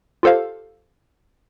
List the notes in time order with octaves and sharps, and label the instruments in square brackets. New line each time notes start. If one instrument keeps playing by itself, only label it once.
[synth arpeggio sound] F4 G4 A4 C5 F5